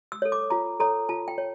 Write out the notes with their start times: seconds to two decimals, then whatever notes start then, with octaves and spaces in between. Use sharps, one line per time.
0.12 E6
0.22 A4 C#5
0.32 D6
0.50 F4 A#5
0.80 A4 C#5 A#5
1.09 F4 A5
1.28 G5
1.38 C#5